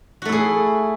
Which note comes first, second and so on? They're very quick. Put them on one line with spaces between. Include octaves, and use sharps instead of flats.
F#4 A3 E4 G#4